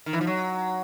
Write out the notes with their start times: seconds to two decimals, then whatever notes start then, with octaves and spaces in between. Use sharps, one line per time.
0.06 D#3
0.13 E3
0.21 F3
0.27 F#3